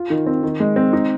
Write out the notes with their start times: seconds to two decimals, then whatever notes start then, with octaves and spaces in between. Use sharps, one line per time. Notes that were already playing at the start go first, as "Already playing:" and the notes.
Already playing: F4
0.10 D#3
0.26 C4
0.43 D#3
0.60 G#3
0.76 C4
0.93 D#4